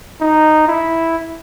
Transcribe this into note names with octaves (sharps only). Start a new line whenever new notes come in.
D#4
E4